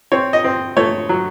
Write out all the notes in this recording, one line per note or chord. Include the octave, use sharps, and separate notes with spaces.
C4 C#5
D#5
C4
A3 C#5
F#3